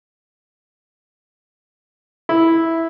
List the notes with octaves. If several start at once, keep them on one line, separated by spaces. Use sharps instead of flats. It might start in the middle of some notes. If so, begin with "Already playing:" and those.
E4